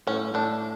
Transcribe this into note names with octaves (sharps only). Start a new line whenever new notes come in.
A2 C#4
A2 D4